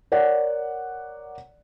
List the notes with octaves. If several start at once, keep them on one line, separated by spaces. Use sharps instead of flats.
A#4 C#5 D5 F#5